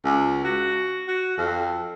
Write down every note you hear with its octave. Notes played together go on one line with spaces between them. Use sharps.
C#2
F#4
F#4
F2